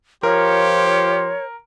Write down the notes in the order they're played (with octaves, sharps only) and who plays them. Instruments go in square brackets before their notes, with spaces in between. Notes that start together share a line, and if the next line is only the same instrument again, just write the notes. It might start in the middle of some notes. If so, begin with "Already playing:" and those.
[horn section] F3 C6 [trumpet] G4 [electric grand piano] A#4 [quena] C#5